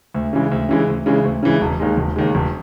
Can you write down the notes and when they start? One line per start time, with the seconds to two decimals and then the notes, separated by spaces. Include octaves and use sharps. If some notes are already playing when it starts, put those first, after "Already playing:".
0.14 D2
0.33 C#3 E3 G#3
0.52 D2
0.69 C#3 E3 G#3
0.88 D2
1.06 C#3 E3 G#3
1.24 D2
1.43 C#3 E3 G#3
1.61 E1
1.80 D#2 D#3 G#3
1.97 E1
2.16 D#2 D#3 G#3
2.35 E1